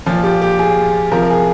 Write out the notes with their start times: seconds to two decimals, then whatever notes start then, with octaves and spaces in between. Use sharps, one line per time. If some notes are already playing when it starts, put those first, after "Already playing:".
0.06 A#2 F3 F4
0.24 G4
0.42 G4
0.59 G#4
1.12 C3 F3 A#4
1.22 A#4
1.30 G#4